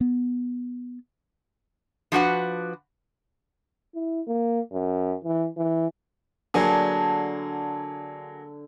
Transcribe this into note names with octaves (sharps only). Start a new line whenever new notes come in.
B3
F3 D4 F#4 B4 F#5
E4
A#3
F#2
E3
E3
D3 F#3 A#3 G#4